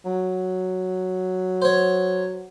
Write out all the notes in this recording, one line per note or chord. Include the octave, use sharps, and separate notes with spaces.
F#3
C5 C#5